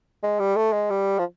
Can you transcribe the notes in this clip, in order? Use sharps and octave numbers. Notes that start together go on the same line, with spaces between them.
G#3
G3
A3
G#3
G3
F3